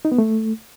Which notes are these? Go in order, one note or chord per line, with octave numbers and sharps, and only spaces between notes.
D#4
B3
A3